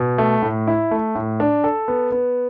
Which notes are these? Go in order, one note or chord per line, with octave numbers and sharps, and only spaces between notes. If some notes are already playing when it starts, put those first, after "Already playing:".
Already playing: B2
A3
A2
E4
A3
A2
D4
A4
B3
B3